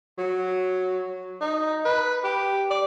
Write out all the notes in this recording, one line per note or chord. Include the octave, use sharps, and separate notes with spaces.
F#3
D#4
B4
G4
D5